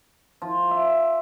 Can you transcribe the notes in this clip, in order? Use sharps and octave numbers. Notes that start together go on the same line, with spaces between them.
F3
E5